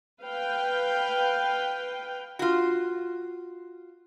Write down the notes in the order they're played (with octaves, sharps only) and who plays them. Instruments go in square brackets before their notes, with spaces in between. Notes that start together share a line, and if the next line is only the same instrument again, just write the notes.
[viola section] B4 F5 G5
[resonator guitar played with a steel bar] F4 F#4